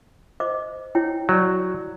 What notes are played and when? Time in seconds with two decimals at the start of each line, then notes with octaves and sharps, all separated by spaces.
0.40 C5 D#5 D6
0.95 E4 C#5 G5
1.29 F#3 C#5 D5